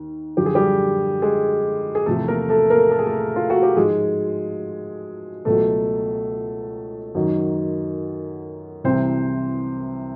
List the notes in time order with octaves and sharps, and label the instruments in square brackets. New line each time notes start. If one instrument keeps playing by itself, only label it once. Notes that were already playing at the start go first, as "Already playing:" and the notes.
Already playing: [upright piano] D#2
F#2 D3 F3 G4
G#4
G3 G4
G#3 G#4
G#4
E2 C3 F3 A3 A4
A#3 A#4
A3 A4
A#3 A#4
A4
G#4
A3 A4
F4
F#4
G4
G#2 F3 G#3 G#4
C#2 B2 F#3 A3 A4
F#2 D#3 F#3
C2 C3 E3 C4 C5